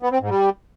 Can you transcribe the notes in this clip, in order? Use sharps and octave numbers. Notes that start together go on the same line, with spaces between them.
B3
C4
G#2
G3